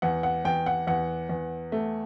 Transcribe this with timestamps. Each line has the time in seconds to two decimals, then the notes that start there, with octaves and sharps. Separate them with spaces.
0.02 E2 F#5
0.23 F#5
0.45 E2 G5
0.66 F#5
0.87 E2 F#5
1.29 E2
1.72 A3